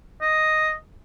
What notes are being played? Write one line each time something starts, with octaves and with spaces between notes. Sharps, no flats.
D#5